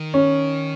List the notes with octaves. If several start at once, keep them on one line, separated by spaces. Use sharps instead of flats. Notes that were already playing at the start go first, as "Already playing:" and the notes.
Already playing: D#3
C#4